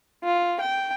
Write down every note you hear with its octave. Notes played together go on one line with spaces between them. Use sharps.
F4
G5